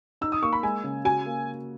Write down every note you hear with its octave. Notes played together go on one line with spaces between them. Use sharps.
D#4 E6
D#6
A#3 C#6
B5
G#3 G#5
C#3
F#4 G#5
A#3